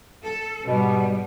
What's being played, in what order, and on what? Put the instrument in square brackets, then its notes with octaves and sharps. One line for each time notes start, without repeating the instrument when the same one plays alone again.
[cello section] A4
[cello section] G#2 G3 B3 [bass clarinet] B2